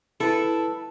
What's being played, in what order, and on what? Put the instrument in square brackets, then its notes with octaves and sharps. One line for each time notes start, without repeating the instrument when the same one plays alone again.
[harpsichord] E4 [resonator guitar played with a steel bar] A4 B4